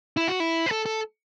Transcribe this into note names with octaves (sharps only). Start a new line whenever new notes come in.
E4
F#4
E4
B4
A4
A4